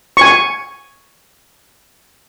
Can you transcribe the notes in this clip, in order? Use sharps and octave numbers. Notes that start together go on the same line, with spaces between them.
G#5 C#6